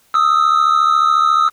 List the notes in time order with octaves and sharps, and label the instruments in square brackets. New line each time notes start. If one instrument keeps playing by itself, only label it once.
[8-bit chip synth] D#6 E6